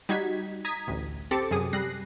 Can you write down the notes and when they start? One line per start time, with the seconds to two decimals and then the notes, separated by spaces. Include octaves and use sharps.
0.09 G3 D#4 F#4 G#6 B6
0.65 A#5 D#6 G#6 B6
0.87 A1 D2
1.31 C4 G4 A4 D6 A6 C#7
1.51 F#2 C3 G#4 D#6
1.73 G3 F#6 A#6 C7